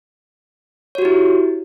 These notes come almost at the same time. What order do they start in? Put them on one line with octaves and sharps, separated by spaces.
C#5 F#4 G4 E4